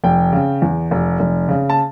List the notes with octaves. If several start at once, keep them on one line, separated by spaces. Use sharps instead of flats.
F1 G5
C#3
E2
F1
F1
C#3
A5